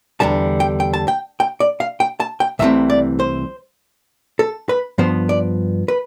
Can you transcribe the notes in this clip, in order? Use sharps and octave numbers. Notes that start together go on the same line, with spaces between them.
E2 D3 G3 A5
G5
G5
A5
G5
G5
D5
F5
G5
A5
G5
C2 C3 E3 A3 C4 E5
D5
C5
A4
B4
G2 F3 B3 C5
D5
B4